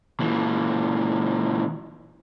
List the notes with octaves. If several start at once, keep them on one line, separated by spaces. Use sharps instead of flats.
A#2 E3